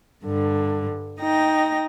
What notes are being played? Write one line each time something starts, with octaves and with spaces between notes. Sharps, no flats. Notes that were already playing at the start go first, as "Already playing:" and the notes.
G2 D3
D#4 G5 A#6